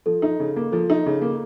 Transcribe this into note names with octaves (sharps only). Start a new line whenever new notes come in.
F3 A4
D#4
C#3
A#3
F3 A4
D#4
C#3
A#3